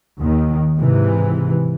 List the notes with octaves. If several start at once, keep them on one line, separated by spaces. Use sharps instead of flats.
D#2 D#3
G#2 C3 E3